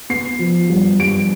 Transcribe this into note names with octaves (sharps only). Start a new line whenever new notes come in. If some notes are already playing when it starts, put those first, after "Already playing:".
B3 C7
F3
G2
G2 D7